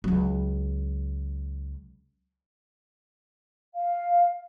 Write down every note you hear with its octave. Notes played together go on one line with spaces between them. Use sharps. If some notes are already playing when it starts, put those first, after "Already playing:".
C#2 F#3
F5